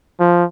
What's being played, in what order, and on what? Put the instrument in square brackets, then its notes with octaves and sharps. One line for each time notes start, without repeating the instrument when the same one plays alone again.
[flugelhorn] F3